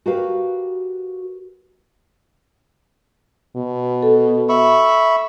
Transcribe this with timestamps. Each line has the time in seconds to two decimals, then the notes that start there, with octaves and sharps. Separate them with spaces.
0.06 F#4 G4 A#4 B4 F5
3.56 B2
4.03 A4
4.49 E5 B5 C#6